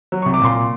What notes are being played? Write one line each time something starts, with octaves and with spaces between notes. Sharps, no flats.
F#3
C#6
C2
D6
A#2 C6